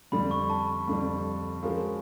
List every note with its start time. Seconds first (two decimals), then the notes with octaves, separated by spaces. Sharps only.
0.12 F2 D3 G3 B5
0.31 C#6
0.50 A5
0.88 F2 D3 G3
1.62 F3 G#3 C#4 F#4 A#4